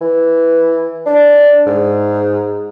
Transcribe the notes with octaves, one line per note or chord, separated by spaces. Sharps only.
E3
D4
G#2